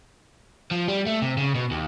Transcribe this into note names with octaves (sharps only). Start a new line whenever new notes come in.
F3
G3
A3
C3
C#3
B2
D#2